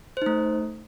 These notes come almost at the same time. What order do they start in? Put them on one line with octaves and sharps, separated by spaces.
C5 D#4 A3